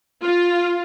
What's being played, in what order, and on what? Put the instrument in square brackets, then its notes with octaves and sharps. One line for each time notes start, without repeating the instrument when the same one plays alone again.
[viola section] F4